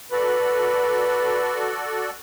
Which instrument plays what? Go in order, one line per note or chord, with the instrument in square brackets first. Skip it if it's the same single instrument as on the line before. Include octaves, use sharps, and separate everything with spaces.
[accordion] F#4 A4 D5 [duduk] B4